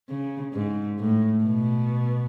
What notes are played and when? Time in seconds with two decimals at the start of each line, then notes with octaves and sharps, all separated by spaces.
0.09 C#3
0.54 G#2
0.99 A2
1.44 B2